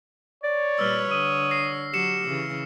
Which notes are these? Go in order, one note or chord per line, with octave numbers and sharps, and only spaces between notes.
C#5 D5
A#2 G3 B4 E6 F6
D3 D#6
A#6 C7
F#3 G4 C7 C#7 E7
C#3 E3